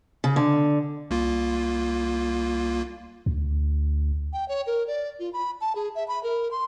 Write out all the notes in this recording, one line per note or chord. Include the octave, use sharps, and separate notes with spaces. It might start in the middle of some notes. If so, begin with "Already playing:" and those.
C#3
D3
C2 A#3 F4
D2
G5
C#5
A#4
D5
F4
B5
A5
G#4
E5
B5
A#4
C6